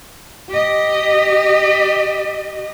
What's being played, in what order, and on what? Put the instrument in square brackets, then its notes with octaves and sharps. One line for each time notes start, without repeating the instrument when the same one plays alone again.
[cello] G4 D#5